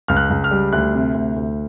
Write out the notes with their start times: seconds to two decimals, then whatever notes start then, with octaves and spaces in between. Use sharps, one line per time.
0.08 C#2 F6
0.17 F#6
0.30 C#2
0.44 F6
0.51 G3
0.73 D2 F#6
0.93 C3
1.14 D2
1.36 D2